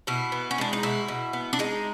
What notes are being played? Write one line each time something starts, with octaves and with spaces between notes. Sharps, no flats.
B2 E4
B3
C#4
G#3 D4
D#4
B2 E4
B2
B3
D4
G#3 D#4